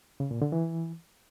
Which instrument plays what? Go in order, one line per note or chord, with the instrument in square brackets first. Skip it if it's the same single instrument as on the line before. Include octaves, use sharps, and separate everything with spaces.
[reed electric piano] C#3
A#2
D3
E3